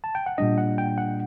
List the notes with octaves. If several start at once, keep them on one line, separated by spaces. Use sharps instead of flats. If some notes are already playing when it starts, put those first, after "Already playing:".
A5
G5
F#5
A#2 G3 D4 D#5
F#5
G5
F#5